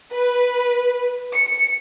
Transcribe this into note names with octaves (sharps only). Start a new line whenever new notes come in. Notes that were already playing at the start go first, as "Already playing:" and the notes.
B4
C#7